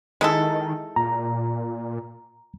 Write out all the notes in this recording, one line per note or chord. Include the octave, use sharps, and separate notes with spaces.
D#3 G#3 E4 A4
A#2 A#5